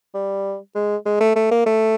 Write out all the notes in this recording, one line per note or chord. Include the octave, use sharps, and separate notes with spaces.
G3
G#3
G#3
A3
A3
A#3
A3